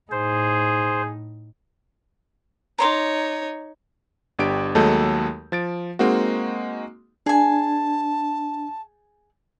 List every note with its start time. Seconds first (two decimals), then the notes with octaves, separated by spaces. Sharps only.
0.12 A2 D#4 G#4 C5
2.78 D#4 C#5 A#5 C6 D6
4.39 G1 D4 G4 D7
4.75 D#2 F#3 G#3 A3 A4 G6
5.52 F3 A6 D7
5.99 G#3 A#3 C4 D#4 F#4
7.26 D4 G#4 G#5 A5